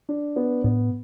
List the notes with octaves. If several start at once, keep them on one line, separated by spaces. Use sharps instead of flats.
D4
B3
A2 B3